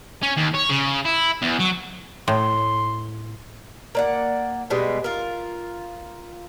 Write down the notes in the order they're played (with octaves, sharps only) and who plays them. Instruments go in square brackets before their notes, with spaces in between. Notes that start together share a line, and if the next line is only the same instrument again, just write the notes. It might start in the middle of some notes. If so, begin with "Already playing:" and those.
[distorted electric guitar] C#4
D#2
C#5
C#3
E4
E2
F#3
[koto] A2 [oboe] C6
[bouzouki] A#3 D5 F#5
B2 G3 G#3 B3
F4 A#4